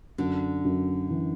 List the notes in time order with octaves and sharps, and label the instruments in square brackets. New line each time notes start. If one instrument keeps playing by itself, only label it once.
[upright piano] F#2 [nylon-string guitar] D3 D4
[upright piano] F#2
E3